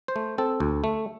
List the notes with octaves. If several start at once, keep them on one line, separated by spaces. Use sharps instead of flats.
C5
A3
C4 A4
D2
A3